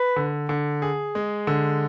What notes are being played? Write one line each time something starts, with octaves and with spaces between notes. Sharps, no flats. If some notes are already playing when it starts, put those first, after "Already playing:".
Already playing: B4
D3
D3
G#4
G#3
D3